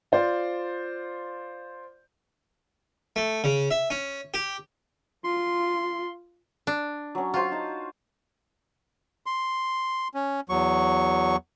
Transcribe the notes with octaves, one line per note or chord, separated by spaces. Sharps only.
F4 C5 D5
A3
C#3
E5
C#4
G4
F4 C6
D4
F#3 C#4
F4 F#4 C5 F5
D#4 A5
C6
C#4
E2 F#3 C#6